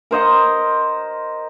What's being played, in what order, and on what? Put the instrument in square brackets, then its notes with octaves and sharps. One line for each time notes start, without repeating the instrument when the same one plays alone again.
[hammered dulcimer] A#4 C5 D#5 F#5